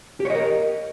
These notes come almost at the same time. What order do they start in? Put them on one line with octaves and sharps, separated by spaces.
G4 C#5 D#5 A#4